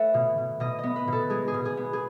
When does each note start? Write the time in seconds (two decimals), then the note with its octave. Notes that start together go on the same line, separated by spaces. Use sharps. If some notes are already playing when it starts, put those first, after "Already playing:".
Already playing: A3 B4 C#5 E5 F#5
0.14 B2
0.38 B2
0.60 B2 D#5
0.79 B3 D#5
0.96 B4
1.08 B2 A4
1.30 G#3 G#4
1.48 G#4
1.54 B2
1.65 G#4
1.77 B3
1.93 G#4